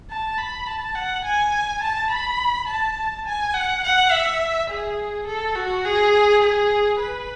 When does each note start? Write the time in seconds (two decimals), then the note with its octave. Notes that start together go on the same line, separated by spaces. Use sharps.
0.10 A5
0.38 B5
0.67 A5
0.95 F#5
1.25 G#5
1.82 A5
2.10 B5
2.68 A5
3.26 G#5
3.54 F#5
3.84 F#5
4.11 E5
4.70 G#4
5.27 A4
5.56 F#4
5.85 G#4
6.42 G#4
7.00 B4